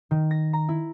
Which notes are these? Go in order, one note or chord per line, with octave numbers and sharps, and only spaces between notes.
D#3
A#6
A#5
E4